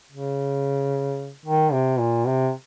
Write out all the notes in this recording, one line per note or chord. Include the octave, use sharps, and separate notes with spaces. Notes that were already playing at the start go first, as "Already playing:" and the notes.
C#3
D#3
C3
A#2
C3